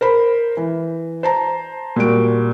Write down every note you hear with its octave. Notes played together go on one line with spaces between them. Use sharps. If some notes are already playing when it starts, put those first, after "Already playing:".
A#4 C5 B5
E3
C5 A5 A#5
A#2 G3 F#4 D7